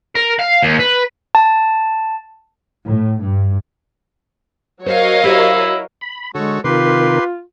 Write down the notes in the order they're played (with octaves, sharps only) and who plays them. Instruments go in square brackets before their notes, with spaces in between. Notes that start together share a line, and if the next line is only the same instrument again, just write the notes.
[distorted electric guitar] A#4
F5
D#2
B4
[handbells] A5
[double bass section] A2
G2
[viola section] F#3 A#4 [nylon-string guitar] C5 [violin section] C#5 D#5 F5
[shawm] E4 [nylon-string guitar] G4 C5 E5
[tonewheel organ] B5
[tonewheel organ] D3 [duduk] G#3 [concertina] F#4 A4 C#5
[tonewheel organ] C3 D#3 A#4 [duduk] F4 [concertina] G4 B4 C6